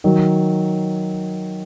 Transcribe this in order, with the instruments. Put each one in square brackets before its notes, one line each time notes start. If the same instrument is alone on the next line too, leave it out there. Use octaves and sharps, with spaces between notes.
[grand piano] D#3 F#3